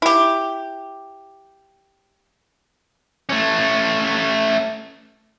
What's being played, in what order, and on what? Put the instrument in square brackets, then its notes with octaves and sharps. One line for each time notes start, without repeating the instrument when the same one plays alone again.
[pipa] E4 G4
[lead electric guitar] A3 C#4